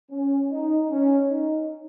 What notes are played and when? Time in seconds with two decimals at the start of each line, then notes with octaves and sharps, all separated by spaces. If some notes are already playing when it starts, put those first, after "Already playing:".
0.11 C#4
0.51 D#4
0.90 C#4
1.30 D#4